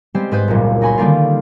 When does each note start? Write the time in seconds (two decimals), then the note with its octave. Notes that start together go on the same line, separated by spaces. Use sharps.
0.14 G3 G#3 B3 C4 G4 C5
0.31 G#2 B3 B4 C5 G6
0.48 F#1 C#2 A#2
0.81 D#4 F#4 G#5 B5 C6
0.98 D3 D#3 G3 A#3 D#4 F4